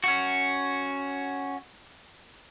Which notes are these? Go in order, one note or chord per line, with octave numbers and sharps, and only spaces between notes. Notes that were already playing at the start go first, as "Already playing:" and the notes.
C#4 F#4